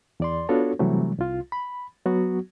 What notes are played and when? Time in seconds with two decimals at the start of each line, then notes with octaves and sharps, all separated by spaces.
0.20 E2 D5 C6
0.49 B3 D4 F4 F#4 A4 C#5
0.79 C3 E3 F#3 G3 A3
1.18 C2 F4
1.52 B5
2.06 F#3 B3 F#4